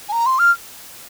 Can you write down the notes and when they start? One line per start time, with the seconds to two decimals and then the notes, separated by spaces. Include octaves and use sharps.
0.09 G#5
0.12 A#5
0.26 C6
0.39 F6